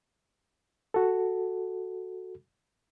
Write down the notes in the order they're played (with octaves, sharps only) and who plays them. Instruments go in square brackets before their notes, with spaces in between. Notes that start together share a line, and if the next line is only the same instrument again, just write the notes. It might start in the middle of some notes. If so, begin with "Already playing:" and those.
[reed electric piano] F#4 A4